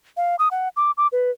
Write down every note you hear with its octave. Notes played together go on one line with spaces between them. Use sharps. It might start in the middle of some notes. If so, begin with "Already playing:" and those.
F5
D#6
F#5
D6
D6
B4